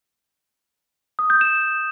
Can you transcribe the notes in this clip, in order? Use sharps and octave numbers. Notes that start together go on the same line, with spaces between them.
D#6
G6
E7